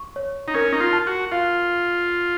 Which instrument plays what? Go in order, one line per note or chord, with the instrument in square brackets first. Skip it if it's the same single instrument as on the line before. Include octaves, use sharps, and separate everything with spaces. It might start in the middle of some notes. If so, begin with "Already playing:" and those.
Already playing: [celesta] C#6
C#5
[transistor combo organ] D#4
[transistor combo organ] C#4 [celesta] A#4
[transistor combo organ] D#4
F4
[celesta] A5
[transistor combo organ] F#4
[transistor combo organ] F4 [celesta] F5